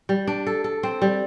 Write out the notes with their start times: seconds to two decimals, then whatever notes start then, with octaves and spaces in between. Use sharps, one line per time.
0.09 G3
0.27 D4
0.47 A4
0.64 A4
0.83 C4
1.02 G3